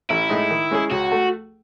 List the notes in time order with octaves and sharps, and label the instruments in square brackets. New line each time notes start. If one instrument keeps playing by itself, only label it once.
[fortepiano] A1 [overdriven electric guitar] E4
[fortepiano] A2 G#3 D#4
D#3
G#3 C#4 G#4
[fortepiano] C#2 [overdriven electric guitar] F#4
[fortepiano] A3